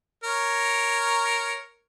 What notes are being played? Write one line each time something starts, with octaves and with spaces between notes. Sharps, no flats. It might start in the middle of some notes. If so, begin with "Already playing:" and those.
A#4 C#5